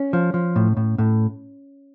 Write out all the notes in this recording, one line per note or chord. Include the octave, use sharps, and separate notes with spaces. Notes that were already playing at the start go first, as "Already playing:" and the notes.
Already playing: C#4
F3
F3
A2
A2
A2